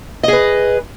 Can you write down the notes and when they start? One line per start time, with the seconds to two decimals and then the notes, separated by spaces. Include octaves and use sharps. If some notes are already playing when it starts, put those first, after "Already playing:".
0.23 D#5
0.28 G#4
0.33 B4